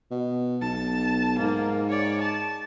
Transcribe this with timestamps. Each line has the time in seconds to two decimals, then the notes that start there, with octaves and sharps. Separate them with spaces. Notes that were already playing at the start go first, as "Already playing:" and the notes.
0.11 B2
0.62 B1 A5
1.39 G#2 A#3
1.90 C#5 D5
2.21 A5